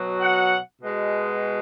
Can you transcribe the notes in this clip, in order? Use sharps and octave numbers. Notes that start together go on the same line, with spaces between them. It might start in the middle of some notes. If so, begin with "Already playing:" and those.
Already playing: B2 F#3
F#5
B2 G#3